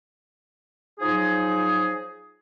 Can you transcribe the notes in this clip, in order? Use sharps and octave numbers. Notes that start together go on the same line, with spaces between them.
F3 F#3 D#4 G#4